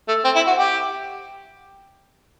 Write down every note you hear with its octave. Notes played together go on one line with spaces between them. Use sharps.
A3
C4
E4
F#4
G4